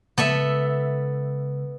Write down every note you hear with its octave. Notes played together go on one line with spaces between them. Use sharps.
C#3 G#3 B3 A4 E5